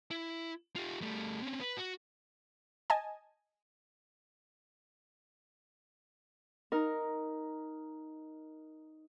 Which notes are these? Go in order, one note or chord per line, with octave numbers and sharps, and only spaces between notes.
E4
F4 G4
G3 A3
C4 C#4
B4
F#4
D#5 G#5 A5
D#4 A#4